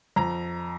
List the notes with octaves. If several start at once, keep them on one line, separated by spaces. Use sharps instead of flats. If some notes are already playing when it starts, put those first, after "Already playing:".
F2 A#5